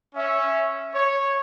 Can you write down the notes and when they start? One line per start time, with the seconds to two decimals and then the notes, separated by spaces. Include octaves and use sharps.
0.15 C#4 E5
0.94 C#5